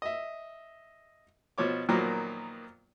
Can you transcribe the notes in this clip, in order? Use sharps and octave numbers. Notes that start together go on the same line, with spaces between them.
D#5 E5
B2 F3 C#5 D6
A#2 D#3 F3 F#3 A#3 B3